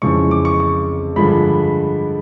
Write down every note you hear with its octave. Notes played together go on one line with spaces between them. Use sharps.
F2 C#3 E3 G#3 C#6
D6
C#6
C#6
G2 D3 F3 G#3 B5